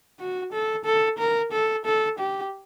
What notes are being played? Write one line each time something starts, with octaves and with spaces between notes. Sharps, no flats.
F#4
A4
A4
A#4
A4
A4
G4